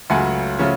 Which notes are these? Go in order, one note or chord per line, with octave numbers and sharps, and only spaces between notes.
C#2 C#3 F#3 A3 F#5 G#5
C#3 F3 A3 C#4